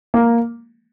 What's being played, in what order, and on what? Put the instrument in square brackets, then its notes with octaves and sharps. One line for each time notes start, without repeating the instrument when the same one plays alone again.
[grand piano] A#3